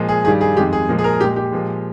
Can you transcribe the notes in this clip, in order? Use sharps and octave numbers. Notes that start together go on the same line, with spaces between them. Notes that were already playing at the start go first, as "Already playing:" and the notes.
Already playing: A#2 F3 G#3
G#4
G2 D#3 G3 G#4
G#4
F2 D#3 G#3 G4
G#4
A#2 F3 G#3
G#4
A#4
A#2 G#3 G4
G4
A#2 F3 G#3